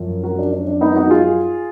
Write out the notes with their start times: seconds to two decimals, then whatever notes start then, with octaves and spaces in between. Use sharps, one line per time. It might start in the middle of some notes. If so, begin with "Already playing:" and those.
Already playing: F#2 F3
0.24 F#4 A#4
0.39 D4
0.53 D4
0.67 D4
0.81 B3 D#4
0.96 D#4 F#4
1.10 F4 G#4